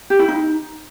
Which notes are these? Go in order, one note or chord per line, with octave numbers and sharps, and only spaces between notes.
G4
E4
D#4